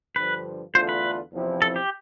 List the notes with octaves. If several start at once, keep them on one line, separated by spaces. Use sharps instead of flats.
G2 D3 F3 B4
E2 D3 A3 D4 F4 C5
B4
E2 C3 F3 C4 E4
A4
G4